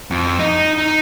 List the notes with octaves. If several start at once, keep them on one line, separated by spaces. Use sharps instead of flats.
F2
D#4
D#4